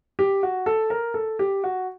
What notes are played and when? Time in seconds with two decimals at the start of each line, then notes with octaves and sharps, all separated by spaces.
0.19 G4
0.43 F#4
0.66 A4
0.90 A#4
1.14 A4
1.39 G4
1.64 F#4